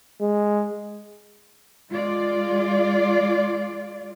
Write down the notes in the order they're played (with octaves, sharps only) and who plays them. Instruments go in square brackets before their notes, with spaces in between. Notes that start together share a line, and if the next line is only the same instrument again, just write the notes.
[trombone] G#3
[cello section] G#3 F4 D5